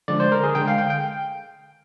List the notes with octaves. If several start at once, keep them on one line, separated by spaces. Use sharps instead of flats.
D3 F3 G#3 D5
C5
A#4
G#4
D3 G#3 G5
F5
G5
G5